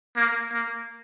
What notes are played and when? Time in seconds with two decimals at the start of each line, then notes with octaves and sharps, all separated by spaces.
0.16 A#3
0.52 A#3